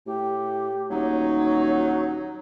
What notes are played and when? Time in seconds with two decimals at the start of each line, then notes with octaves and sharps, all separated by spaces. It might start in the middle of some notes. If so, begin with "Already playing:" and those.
0.06 A2 G4
0.90 D#1 F#3 D#4 C#5